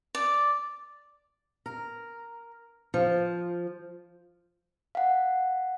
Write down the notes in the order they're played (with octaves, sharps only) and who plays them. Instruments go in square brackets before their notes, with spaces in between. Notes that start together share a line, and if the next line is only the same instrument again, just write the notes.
[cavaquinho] D5
[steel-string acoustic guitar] A#4
F3
[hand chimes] F5 F#5